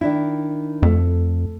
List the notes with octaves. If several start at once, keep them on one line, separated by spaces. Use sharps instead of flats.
D#3 D4 E4
F2 A3